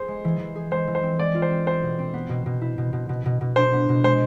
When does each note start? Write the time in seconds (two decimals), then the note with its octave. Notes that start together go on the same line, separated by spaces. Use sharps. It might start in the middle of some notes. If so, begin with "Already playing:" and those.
Already playing: G#4 C5
0.08 G#3
0.24 E3
0.40 E3
0.56 G#4
0.71 G#3 C5
0.88 E3
0.95 C5
1.03 C4
1.19 G#3 D5
1.35 F4
1.42 C5
1.51 C4
1.66 C4 C5
1.83 B2
1.99 C4
2.14 B3
2.29 B2
2.46 B2
2.61 E4
2.78 B2
2.93 B2
3.09 B2
3.26 B2
3.41 B2
3.56 D4 C5
3.73 B3
3.89 B2
4.04 G#3 C5